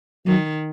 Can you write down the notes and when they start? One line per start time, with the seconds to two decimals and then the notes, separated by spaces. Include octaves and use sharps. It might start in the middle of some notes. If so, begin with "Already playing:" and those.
0.26 D#3 F#3